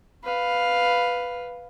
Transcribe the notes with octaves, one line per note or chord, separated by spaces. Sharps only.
B4 F5